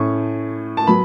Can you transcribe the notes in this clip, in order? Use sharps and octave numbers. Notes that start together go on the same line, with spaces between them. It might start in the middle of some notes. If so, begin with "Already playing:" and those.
Already playing: A2 A3 C#4 C#6
A5
F#3 B3 B5